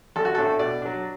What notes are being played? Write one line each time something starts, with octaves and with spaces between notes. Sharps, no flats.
A1 A4
F#4
A2 A3 D4 A4
B2 D5
F#3 D4